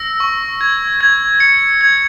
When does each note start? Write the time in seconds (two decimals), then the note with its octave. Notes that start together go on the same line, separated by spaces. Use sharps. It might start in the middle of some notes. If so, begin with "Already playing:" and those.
Already playing: E6 A#6
0.20 C#6
0.61 G#6
1.01 G#6
1.40 C#7
1.81 G#6